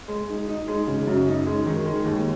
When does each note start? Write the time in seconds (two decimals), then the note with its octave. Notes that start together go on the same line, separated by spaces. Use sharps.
0.08 G#3
0.28 D#4
0.48 D#4
0.68 G#3
0.87 C#3
1.07 F#2
1.27 D#4
1.46 G#3
1.66 D#3
1.86 G#3
2.05 D#2